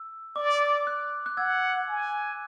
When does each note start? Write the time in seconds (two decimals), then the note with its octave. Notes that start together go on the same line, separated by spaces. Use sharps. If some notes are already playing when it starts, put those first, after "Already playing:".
Already playing: E6
0.36 D5 D6
0.87 F#6
1.26 F#6
1.37 F#5 E6 G#6
1.88 G#5